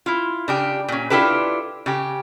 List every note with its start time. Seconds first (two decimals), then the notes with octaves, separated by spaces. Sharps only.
0.06 E4 F4
0.48 C#3 D4 G4
0.88 A#2 C#4
1.10 D4 E4 F4 G4 A4 B4
1.86 C#3 G4